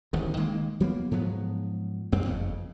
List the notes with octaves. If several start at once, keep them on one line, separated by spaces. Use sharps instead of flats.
D1 A1 D#3
D#3 G#3 A#3
F#3 G3 A#3 B3
G#2 F3 F#3 B3
A1 F#2 C4
F#1 F2 C#3